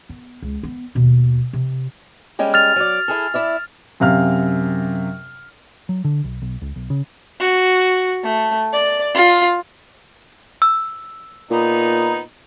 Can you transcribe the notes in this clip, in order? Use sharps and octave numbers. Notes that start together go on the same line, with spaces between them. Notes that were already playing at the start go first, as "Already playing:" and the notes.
B3
C#2
B3
D#2 B2
C3
G3 G#3 C#4
F6 A6 F7
F#3 D5
E4 G#4 A4
E4 D5 E5
F#2 C3 F5 F6
F#3
D3
B1
B1
C#2
B1
C#3
F#4
A3
D5
F4
E6
A#2 B3 D#4